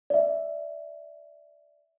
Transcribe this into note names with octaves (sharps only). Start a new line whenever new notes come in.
D5 E5